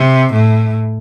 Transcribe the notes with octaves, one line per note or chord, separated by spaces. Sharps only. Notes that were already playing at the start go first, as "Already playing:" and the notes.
Already playing: C3
A2